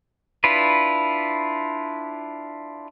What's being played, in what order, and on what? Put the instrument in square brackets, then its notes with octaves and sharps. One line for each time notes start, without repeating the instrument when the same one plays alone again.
[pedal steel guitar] D4 E4 F4 B4